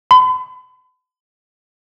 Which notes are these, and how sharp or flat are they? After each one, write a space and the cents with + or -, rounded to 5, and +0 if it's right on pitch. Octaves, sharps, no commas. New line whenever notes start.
B5 +40